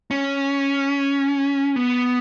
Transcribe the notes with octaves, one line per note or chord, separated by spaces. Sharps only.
C#4
B3